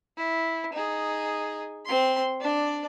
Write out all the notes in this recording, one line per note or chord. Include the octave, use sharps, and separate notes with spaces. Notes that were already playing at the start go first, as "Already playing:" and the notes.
E4
D#4 G#4
C4 C6
D4 D5